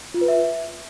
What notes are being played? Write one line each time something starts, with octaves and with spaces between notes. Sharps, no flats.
F4
B4
E5